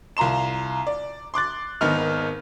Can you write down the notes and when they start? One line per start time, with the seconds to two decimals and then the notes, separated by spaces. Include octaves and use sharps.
0.17 C2 F4 A#5 C6 E7
0.87 D5
1.34 C6 D6 F#6 A6
1.81 G#1 D#3 B3 D#4 F6 F7